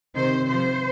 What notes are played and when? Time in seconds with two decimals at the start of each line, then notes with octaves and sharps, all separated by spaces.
0.16 C3 D#3 C5
0.48 C3 F3 C5